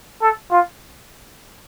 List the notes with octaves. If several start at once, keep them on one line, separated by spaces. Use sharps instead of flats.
A4
F4